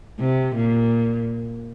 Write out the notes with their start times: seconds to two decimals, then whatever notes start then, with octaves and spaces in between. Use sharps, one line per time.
0.20 C3
0.55 A#2